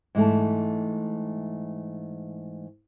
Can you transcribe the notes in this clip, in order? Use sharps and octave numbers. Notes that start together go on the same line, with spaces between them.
G#2 E3 A3 A5